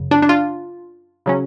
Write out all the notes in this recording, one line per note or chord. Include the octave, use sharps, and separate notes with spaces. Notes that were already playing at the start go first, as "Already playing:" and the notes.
Already playing: F#2 C#3
D4
D4
F4
C#3 F#3 C#4